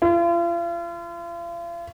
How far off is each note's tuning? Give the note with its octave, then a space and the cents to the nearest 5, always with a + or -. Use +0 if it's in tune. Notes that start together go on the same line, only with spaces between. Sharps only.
F4 -40